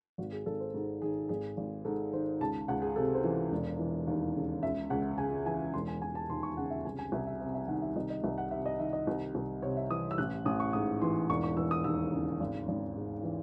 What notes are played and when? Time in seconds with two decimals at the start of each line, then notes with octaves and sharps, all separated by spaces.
0.18 G#1 F#4
0.32 G#4
0.46 G#1 A4
0.60 C5
0.74 G#2
1.02 D#3 G#4
1.29 G#1 G#4
1.57 G#1
1.85 G#2 A4
2.13 D#3 C5
2.41 C#2 A5
2.68 C#2 F#5
2.82 G#4
2.96 C3 A4
3.14 C5
3.24 E3
3.52 E1
3.79 E3
4.07 D#2
4.35 C#3
4.63 C#2 E5
4.90 C#2 F#5
5.18 C#3 G#5
5.46 E3 G#5
5.74 E1 C6
5.88 G#5
6.01 E1 G#5
6.15 A5
6.29 D#2 C6
6.43 C#6
6.57 C#3 F#5
6.70 E5
6.85 C2 G#5
6.99 G#5
7.12 C2 E5
7.27 E5
7.40 C3 E5
7.54 E5
7.68 D#3 F#5
7.82 E5
7.96 C2 D#5
8.10 D#5
8.24 C2 E5
8.38 F#5
8.51 C3 E5
8.66 D#5
8.79 D#3 E5
8.93 D#5
9.07 C2
9.35 C2
9.62 C3 C#5
9.77 E5
9.90 E3 D#6
10.11 E6
10.18 A1 F#6
10.45 A1 D#6
10.60 C#6
10.73 G#2 D#6
11.02 E3 C6
11.29 E1 C#6
11.44 C#6
11.57 E3 E6
11.71 D#6
11.84 D#2 E6
12.12 C#3
12.40 G#1
12.68 G#1
12.96 G#2
13.23 E3